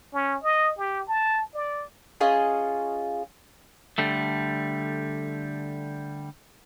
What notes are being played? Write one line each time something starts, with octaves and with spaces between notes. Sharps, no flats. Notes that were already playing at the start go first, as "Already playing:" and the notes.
C#4
D#5
G4
A5
D5
C#4 F4 G#4 D#5
D3 G3 A3